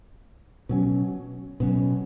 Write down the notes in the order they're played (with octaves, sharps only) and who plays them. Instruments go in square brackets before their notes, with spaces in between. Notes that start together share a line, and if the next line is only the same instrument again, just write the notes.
[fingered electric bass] B2 F#3 C#4
B2 F#3 C#4